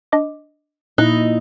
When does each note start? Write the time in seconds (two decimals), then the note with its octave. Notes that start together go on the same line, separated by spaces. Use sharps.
0.12 D4 D#5 D6
0.98 A#2 D#4 E4 D#5 F#6